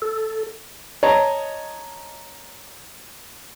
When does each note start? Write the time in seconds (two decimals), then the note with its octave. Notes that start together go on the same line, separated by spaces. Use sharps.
0.02 A4
1.03 C#5 D#5 A5 A#5